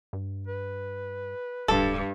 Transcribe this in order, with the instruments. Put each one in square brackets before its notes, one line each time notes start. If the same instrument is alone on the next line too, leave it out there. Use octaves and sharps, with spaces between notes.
[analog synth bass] G2
[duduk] B4
[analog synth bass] D1 [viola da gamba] G2 [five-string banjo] A4